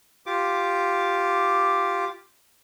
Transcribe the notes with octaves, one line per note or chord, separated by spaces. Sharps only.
F4 G4 D6